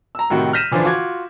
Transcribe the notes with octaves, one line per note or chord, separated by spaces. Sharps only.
A#5 E6
A2 C3 D#3 F#4 G5
F6 G6 A#6 B6 D#7 E7
D3 E3 F3 D4 C5
F4 F#4 D6 G#6